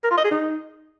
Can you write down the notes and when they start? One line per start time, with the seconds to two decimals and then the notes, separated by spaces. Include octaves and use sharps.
0.04 A#4
0.11 F4
0.17 D#5
0.24 G#4
0.31 D#4